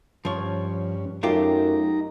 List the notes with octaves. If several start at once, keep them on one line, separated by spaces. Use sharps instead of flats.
G2 F3 C#4 C#5
F#2 A3 D#4 F4 G4 A#5